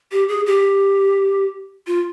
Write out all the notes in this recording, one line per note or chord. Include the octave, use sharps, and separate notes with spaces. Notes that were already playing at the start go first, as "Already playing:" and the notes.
G4
G#4
G4
F4